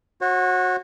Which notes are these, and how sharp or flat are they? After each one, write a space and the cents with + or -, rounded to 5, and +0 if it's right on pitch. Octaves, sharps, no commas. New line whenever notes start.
F#4 -15 C#5 -40